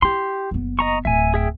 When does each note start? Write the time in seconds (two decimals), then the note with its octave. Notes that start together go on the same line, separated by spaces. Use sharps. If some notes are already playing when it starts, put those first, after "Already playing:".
0.02 E4 G4 C6
0.51 F#1 B3
0.79 D#5 A#5 C#6
1.05 D1 E5 G#5
1.34 G#4 E5 G5